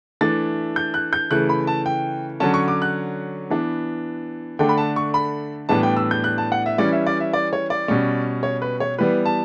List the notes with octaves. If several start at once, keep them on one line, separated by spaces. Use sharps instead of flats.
E3 A3 D4 A6
G6
F#6
G6
C#3 E3 A3 F#6
B5
A5
G5
D3 F#3 C#4 A5
C#6
D6
F#6
E3 B3 D4
D3 A3 D4 G5
B5
A5
C#6
B5
A2 E3 G3 B3 D4 A5
G5
E6
G6
F#6
A5
F#5
E5
E3 G3 C#4 D5
E5
D5
E5
D5
C#5
D5
B2 G3 C#4
C#5
B4
C#5
E3 G3 B3 B4
A5